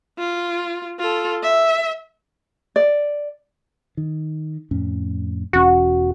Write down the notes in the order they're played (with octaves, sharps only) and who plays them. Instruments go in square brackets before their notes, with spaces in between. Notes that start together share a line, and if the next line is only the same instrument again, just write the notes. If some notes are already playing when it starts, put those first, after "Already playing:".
[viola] F4
F4 A4
E5
[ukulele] D5
[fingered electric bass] D#3
F2 A2 C#4
[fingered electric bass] E1 E2 C#4 [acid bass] F#4